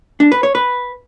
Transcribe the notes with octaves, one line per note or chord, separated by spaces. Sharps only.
D4
B4
C#5
B4